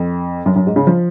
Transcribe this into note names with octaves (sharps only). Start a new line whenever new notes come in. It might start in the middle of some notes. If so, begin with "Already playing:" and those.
Already playing: F2
F#2
F#2
G#2
C#3
F3